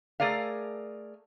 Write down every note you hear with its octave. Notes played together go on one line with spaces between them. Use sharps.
A3 G#4 A#4 D5 F5